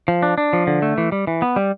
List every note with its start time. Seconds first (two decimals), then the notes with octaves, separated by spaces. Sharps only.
0.08 F3
0.23 D4
0.38 D4
0.53 F3
0.67 D3
0.82 A3
0.98 E3
1.12 G3
1.27 E3
1.42 B3
1.56 G3